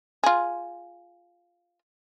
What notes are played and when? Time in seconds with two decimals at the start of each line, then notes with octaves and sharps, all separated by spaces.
0.24 F4 G#4